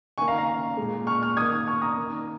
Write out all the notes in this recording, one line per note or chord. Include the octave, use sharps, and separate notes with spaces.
D#3 A#3 G#5 C#6
F5 A#5
F5 A#5
A#2 G#3
C#6 F6
C#6 F6
D#3 A#3 D#6 G#6
C#6 F6
A#5 D#6
D#3 A#3